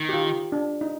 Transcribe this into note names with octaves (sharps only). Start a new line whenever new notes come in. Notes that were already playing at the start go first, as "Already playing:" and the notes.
Already playing: D#3
G4
F4
D4
D#4